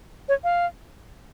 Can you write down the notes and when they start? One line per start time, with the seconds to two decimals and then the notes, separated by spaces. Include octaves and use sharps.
0.29 C#5
0.44 F5